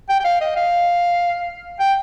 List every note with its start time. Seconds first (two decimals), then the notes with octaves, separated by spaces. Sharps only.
0.09 G5
0.20 G5
0.24 F5
0.41 D#5
0.56 F5
1.80 G5